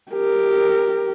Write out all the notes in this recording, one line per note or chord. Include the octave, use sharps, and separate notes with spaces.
G4 A#4